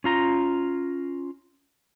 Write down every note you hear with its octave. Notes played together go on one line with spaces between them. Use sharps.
C#4 F4 A#5